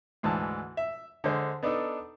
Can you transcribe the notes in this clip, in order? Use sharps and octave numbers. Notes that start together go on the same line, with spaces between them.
D2 G#2 E3 A5
E5
D3 G#3 C5
B3 D4 D#4 A4